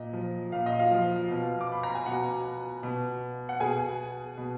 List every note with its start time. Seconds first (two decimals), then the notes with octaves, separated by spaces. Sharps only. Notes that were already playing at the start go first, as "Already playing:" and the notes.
Already playing: A#2 D#5
0.13 F3
0.52 A#2 F5
0.66 D#5
0.79 F4 F5
0.91 F3
1.29 B2
1.61 D6
1.72 B5
1.83 A#5
1.95 G#5
2.06 B2 F#4 F#5
2.83 B2
3.49 F#5
3.60 B2 G#4 G#5
4.38 B2